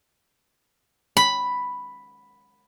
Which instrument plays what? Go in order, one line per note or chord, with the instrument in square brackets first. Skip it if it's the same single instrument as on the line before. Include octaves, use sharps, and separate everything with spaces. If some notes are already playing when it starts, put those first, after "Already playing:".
[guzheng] B5